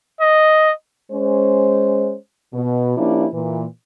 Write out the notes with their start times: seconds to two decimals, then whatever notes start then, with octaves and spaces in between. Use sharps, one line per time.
0.21 D#5
1.11 G#3 C#4 C5
2.54 B2
2.97 F3 A#3 C#4 D4 E4 G4
3.32 A#2 E3